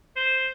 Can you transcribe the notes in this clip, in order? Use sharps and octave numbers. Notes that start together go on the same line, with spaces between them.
C5